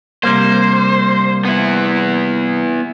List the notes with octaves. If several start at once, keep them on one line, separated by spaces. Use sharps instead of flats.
C3 G3 A#3 C5
B3 E4